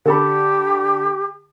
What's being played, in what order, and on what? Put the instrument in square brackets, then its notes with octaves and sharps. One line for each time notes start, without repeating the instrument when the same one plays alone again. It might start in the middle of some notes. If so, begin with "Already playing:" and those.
[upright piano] D3 A4 B5 [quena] G4